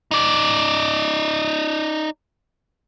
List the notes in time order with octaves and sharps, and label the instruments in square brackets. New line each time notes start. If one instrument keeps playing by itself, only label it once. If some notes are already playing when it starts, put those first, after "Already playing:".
[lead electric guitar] D#4 D5